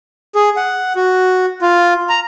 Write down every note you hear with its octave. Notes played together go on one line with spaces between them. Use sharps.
G#4
F#5
F#4
F4
A#5